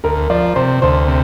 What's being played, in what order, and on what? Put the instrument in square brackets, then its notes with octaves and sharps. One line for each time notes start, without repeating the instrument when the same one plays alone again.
[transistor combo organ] D2 [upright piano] A#4
[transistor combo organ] F3 [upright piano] D5
[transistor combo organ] C3 [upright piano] C5
[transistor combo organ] D2 [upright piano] C5
[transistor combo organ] C3